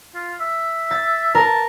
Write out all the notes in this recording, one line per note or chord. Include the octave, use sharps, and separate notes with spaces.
F4
E5
A6
A#4 A5